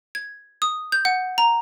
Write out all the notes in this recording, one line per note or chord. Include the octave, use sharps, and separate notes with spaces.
G#6
D#6
G6
F#5
A#5